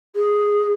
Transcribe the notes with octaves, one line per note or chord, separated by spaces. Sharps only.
G#4